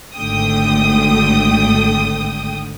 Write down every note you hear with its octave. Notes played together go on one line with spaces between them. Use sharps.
G#1 D3 A3 G5 D#6